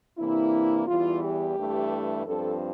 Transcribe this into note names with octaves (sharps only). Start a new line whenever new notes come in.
C3 E3 A#3 D4 E4
E2 E3 G3 F4
G4
G2 E3 A3
G2 F3 C4 A4